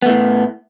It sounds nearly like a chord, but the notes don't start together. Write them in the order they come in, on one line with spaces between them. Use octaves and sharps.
B3 A3 A2